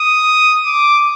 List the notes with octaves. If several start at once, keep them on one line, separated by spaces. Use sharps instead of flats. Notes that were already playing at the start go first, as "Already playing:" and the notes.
Already playing: D#6
D6